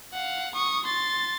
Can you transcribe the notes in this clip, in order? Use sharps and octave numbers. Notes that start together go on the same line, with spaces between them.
F5 F#5
C#6 D#6
C6 A6